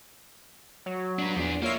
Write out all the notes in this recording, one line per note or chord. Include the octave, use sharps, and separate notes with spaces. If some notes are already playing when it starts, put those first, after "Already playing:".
F#3
D4 B4
E2 F3 D4
A#3 F4 C#5 E5